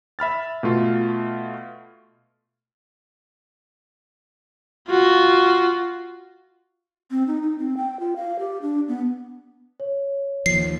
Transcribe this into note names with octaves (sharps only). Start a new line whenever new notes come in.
E5 B5 F6 A6
B2 A3 F4
F4 F#4
C4
D#4
D#4
C4
G5
F4
F5
G4
D4
B3
C#5
D#2 F3 C7